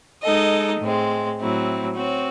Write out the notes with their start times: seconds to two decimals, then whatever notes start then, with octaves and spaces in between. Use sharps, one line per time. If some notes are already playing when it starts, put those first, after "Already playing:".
0.23 G#3 D#4 A4 D#5
0.80 A2 G#3 C4
1.39 A2 F#3 C4 E4
1.96 C4 F#4 C#5